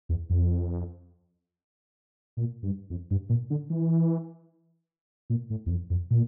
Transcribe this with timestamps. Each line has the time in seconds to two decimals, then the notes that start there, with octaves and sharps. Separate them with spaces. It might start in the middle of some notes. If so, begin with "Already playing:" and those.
0.09 E2
0.30 F2
2.37 A#2
2.63 G2
2.90 F2
3.11 G2
3.29 A#2
3.50 D3
3.70 E3
5.30 A#2
5.50 A2
5.66 E2
5.70 F2
5.90 F2
6.11 A#2